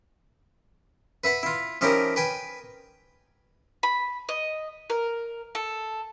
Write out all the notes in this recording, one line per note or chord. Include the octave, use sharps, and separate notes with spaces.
B4 E5 F#5 B5
E4 F4
F3 C#4 D#4 E4 G4 A#4
B4 G5 G#5
B5
D#5
A#4
A4